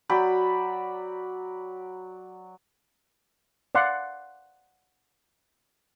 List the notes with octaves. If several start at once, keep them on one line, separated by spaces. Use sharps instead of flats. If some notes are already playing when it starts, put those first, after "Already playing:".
F#3 D5 G5 B5
D5 F5 F#5 C6